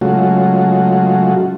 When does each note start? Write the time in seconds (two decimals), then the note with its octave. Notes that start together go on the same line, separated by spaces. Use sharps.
0.01 C#3 F#3 G#3 A3 F4 F#4